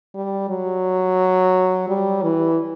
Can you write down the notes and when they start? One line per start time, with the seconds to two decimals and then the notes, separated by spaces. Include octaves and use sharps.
0.15 G3
0.49 F#3
1.88 G3
2.23 E3